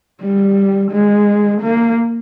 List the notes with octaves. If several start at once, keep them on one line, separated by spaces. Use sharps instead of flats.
G3
G#3
A#3